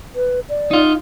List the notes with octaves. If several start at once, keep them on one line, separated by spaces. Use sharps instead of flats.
B4
D5
D#4 F4